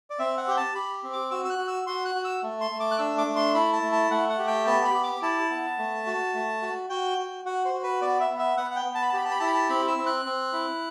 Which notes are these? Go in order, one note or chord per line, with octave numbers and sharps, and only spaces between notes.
D5
C4 E5
F#5
G4 G5
A5
G4 B5
C4
D6
F#4 E6
E6
F#6
F#4
E6
F#4 C6
F#6
F#4
E6
A3
C6
A3
D6
F#6
D4 E6
D6
A3
C6
E4 B5
A5
A3
A5
A3 F#5
F#5
G4
G5
B3 A5
B5
G4
D6
E4 A5
B3
A3
F#4
A3
F#4
F#4 G5
F#4
F#4 F#5
C5
F#4
B4
B3 D5
E5
B3
E5
B3 F#5
F#5
G5
B3
A5
B5
A5
G4 B5
A5
B5
E4 A5
B5
A5
C4 B5
E6
C4
F#6
C4
E4